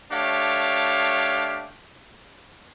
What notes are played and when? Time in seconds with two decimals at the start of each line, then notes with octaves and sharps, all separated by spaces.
0.12 A3 D4 G4 C#5 F5